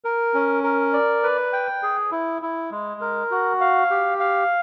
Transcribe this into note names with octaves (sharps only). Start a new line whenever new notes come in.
A#4
C#4
A#4
D5
B4
G5
G#4
E4
E4
G#3
A#4
F#4
F5
G4
F5